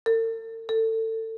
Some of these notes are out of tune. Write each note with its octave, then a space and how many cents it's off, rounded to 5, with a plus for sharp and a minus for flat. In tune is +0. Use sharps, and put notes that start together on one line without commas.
A4 +45
A4 +25